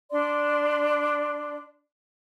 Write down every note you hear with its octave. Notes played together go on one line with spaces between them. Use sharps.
D4 D5 C6